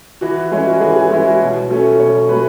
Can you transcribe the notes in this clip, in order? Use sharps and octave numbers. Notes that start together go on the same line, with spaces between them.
E3 F#4
G#3 C#4 E4 G#4
F#4
E3 G#4
G#4
G#3 C#4 E4 G#4
F#4
B2
F#3 A3 C#4 A4
B2 C#5
F#3 A3 C#4 B4